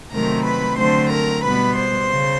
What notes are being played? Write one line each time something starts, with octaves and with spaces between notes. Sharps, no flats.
C3 D#3 F#3 A3 C4 A#4 A#5
B4 B5
D3 F#3 A3 C4 C5 C6
A#4 A#5
B2 G3 B3 B4 B5
C5 C6
C#3